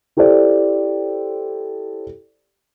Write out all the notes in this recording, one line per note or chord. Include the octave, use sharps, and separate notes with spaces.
E4 G4 A4 C5 D5